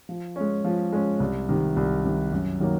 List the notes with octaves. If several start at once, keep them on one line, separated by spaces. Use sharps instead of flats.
F3
G#3 C#4
F3
G#3 C#4
C2
C3 D#3
C2
C3 D#3
F#2
D#3 F#3 A#3